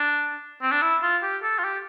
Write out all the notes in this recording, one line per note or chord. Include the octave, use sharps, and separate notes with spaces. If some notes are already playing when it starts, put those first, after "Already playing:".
Already playing: D4
C4
D4
E4
F4
G4
A4
F4
G4